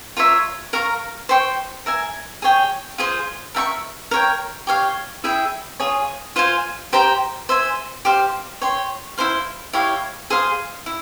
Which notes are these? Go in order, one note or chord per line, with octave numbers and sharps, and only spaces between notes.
F4 A#4 C#5 E5
A#4 F5 A#5 C#6
C5 G5 C#6
A#4 E5 G#5
G#4 C#5 G5
F4 G#4 C5
A#4 E5 G5 C#6
A#4 C#5 G5
G4 C#5 F5
E4 G#4 E5 G5
F4 G#4 C#5
F4 C5 F5 G#5
G4 C5 G5 A#5
C5 E5 G#5
G4 C5 F5
C#5 G5 C6
E4 G4 C5 F5
E4 G4 C#5 F5
G#4 C5 F5 C6
E4